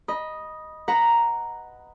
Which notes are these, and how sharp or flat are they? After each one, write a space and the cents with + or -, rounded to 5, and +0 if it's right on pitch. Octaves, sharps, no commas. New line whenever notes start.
D#5 +0 B5 -25
B4 +5 F#5 +0 A#5 +0